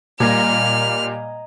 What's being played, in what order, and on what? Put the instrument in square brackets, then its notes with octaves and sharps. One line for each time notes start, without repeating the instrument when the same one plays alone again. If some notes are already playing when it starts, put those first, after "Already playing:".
[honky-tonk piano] A#2 A#6 [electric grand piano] G3 A#3 [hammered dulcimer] D#5 G#5 A#5 [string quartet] F6